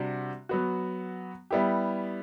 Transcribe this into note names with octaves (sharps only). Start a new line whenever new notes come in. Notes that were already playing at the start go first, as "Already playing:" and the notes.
Already playing: C3 G3 D4 F#4
F#3 B3 F#4
G3 B3 E4 G4